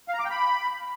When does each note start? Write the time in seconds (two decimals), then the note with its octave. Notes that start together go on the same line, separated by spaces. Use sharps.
0.08 F5
0.14 A#5
0.19 D6
0.25 G5
0.30 B5